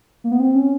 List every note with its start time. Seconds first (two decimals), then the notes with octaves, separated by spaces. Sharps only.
0.24 A#3
0.31 B3
0.40 C4
0.55 C#4